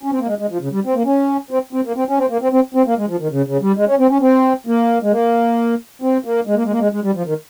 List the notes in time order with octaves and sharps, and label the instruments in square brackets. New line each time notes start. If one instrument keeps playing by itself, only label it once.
[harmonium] C#4
C4
A#3
G#3
G#3
F3
C#3
G3
C4
A#3
C#4
C4
C4
A#3
C4
C#4
C4
A#3
C4
C4
C4
A#3
G#3
F3
D#3
C#3
C#3
G3
G#3
C#4
C4
C#4
C4
A#3
G#3
A#3
C4
A#3
G#3
A#3
G#3
A#3
G#3
G#3
G3
F3
D#3